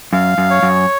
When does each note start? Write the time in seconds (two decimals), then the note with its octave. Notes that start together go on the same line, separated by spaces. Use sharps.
0.13 F#2 F5
0.38 F#2
0.50 C#5
0.63 F#2